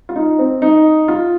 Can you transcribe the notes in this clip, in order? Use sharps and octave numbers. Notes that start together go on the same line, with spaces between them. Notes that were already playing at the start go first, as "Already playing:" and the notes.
F4
D#4
C4
D#4
F4